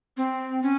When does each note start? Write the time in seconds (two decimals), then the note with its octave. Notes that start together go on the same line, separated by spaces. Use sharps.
0.17 C4
0.62 C#4